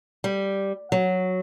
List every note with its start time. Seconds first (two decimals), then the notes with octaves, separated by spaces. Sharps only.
0.24 G3
0.92 F#3